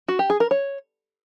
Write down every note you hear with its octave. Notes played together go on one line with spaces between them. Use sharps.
F#4
G4
G#4
A#4
C#5